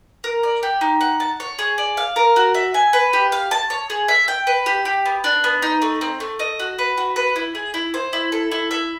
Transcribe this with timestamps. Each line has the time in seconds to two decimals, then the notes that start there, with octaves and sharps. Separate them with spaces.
0.24 A#4
0.43 D5
0.63 G4
0.81 D#4
1.01 F#5
1.20 A5
1.40 C#5
1.59 G#4
1.78 D5
1.97 F5
2.16 A#4
2.36 F#4
2.54 E5
2.74 G#5
2.93 B4
3.13 G4
3.32 F5
3.51 A5
3.70 C#5
3.90 G#4
4.08 E5
4.28 G5
4.47 B4
4.66 G4
4.85 G4
5.06 B3
5.24 D4
5.44 B3
5.62 D#4
5.82 A3
6.01 C4
6.20 A3
6.39 D#5
6.60 F#4
6.79 B4
6.98 F#4
7.16 B4
7.36 E4
7.55 G#4
7.74 E4
7.94 C5
8.13 E4
8.32 A4
8.51 E4
8.71 E5